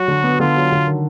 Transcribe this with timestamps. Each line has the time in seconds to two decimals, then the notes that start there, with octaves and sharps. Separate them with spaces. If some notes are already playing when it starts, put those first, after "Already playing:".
Already playing: F#3 F#4
0.08 D3
0.23 B3
0.40 D3 F4
0.56 F#3
0.72 D3
0.87 D#3